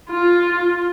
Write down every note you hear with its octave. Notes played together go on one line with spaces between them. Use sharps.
F4